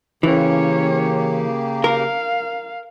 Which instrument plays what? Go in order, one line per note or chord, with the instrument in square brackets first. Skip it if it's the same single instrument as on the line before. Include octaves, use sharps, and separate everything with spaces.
[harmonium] C#3 A#3 G4 [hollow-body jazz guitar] E3 [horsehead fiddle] C#4 C#5
[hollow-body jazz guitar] A#4 [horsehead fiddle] F5